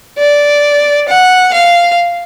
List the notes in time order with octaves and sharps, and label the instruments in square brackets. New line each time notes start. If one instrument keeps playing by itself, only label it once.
[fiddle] D5
F#5
F5